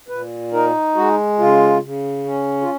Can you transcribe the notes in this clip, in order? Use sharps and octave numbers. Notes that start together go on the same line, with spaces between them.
A#2 B4
D#4 A#4
G#3 F#4
C#3 F4
C#3
C#4
F4